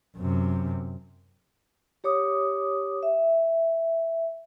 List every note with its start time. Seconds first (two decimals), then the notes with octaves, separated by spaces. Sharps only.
0.17 F#2 C3
2.04 G4 C#5 D6 D#6
3.03 E5